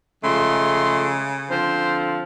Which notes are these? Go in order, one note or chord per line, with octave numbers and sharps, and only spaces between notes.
C#3 F3 G#3 A3 C6
D3 F3 C4 C5